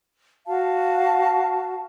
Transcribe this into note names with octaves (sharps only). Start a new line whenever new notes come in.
F#4 F5 A5